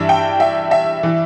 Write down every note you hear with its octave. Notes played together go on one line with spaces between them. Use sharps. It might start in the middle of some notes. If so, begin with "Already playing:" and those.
Already playing: G2 E3 E5
G5
E5
E5
E3